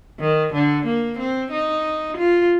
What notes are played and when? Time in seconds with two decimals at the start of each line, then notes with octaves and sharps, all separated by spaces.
0.20 D#3
0.54 D3
0.86 A#3
1.18 C4
1.52 D#4
2.17 F4